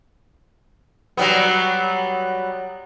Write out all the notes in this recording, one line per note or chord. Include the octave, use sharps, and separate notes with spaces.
F#3 G3 B3